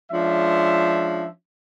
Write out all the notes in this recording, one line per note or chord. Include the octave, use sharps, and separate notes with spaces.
F3 G#3 C#4 D4 E5